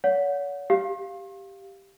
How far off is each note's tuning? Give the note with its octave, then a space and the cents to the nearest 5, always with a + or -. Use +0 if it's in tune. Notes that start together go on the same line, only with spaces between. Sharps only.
C#5 +40 F#5 -20
G4 +0 F5 +0